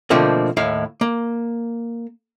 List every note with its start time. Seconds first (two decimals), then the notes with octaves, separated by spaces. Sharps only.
0.10 B2 D3 F3 A3 A#3 C4
0.57 D#2 A2 E4 F5
1.01 A#3